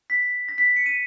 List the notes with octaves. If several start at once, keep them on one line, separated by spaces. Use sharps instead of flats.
B6
A#6
B6
C#7
D#7